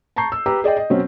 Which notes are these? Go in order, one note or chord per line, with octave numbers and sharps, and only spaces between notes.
A5 A#5 C#6 G6 C7
E6
G4 B4 A#5 E6
G#4 D5 D#5 G5
D#5
B2 F#3 C4 C#4